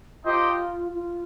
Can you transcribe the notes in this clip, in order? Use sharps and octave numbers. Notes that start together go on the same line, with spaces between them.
D#4 F4 G4 C5 D#5 G5
F4